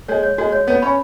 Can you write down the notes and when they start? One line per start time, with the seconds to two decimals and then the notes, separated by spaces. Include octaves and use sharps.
0.08 G#3 C#5
0.23 C#5
0.38 G#3 F#4
0.52 C#5
0.67 B3 C#5
0.82 C#4 B5